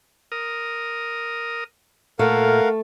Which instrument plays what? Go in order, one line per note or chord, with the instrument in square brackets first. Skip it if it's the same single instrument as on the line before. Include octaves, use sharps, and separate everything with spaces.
[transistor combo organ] A#4 D#6
[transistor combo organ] A#2 [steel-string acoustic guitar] A3 [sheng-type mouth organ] A#4 F5 F#5